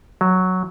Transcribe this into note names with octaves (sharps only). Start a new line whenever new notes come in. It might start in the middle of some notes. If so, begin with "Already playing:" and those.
F#3